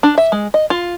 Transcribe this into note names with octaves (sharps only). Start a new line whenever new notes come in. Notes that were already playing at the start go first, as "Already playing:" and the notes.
D4
E5
G#3
D#5
F4